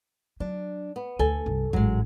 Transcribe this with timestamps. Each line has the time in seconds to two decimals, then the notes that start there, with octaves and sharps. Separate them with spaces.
0.40 F#3 D4
0.96 B3
1.19 D2 A4 G#5
1.46 C2 G2
1.73 A1 G#2 F#3 G#3